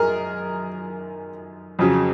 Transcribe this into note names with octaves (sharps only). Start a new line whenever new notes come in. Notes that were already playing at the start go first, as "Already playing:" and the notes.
Already playing: F#2 D#3 G#4 A#4
F2 C#3 F#3